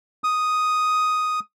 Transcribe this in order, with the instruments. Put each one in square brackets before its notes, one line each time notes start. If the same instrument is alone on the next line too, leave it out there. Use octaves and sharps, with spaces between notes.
[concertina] D#6